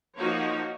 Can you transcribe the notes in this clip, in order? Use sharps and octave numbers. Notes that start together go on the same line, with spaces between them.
F3 A#3 D#4 F#4 C#5